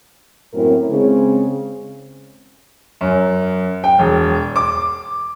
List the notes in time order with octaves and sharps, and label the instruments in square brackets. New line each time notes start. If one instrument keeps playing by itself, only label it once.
[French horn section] F#2 A2 A#3 C4 E4 A#4
C#3 G#3 C4
[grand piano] F#2
G5
E1
D6